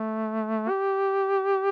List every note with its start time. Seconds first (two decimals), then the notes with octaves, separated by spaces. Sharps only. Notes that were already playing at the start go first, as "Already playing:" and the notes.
Already playing: A3
0.70 G4